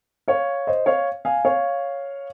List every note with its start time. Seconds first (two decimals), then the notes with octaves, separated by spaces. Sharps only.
0.28 C#5 F5
0.67 C5 D#5
0.86 C#5 F5
1.25 F5 G#5
1.45 C#5 F5